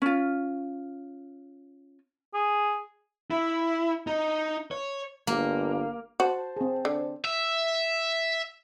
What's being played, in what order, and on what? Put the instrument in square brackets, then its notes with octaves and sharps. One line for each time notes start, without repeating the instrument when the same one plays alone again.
[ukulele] C#4 F4
[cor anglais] G#4
[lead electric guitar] E4
D#4
C#5
[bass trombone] G1 [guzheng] A#3
[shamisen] F#4 [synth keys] C5 A5
[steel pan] C4 G#4
[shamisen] D3
[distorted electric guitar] E5